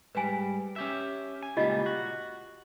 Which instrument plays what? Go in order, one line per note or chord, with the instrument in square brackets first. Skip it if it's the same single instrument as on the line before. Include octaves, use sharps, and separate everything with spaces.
[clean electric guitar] G#2 G3 [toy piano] B4 G#5
[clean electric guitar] C#4 G4 E5
G#5
[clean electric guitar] C#2 A#2 G3 [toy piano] F4 G4 D#5
[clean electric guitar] F#4